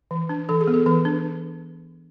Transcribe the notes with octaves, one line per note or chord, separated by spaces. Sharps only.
E3
D4
E3 A4
G#4
B3
A4
E3 B4
D4